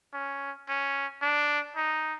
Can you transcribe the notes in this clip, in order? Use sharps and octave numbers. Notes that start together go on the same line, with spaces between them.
C#4
C#4
D4
D#4